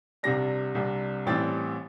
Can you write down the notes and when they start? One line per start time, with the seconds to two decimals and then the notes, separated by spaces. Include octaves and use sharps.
0.23 C2 C3 G3 D4 A#6
0.75 C2 C3 G3 D4
1.26 A1 A2 E3 G3 C4 A6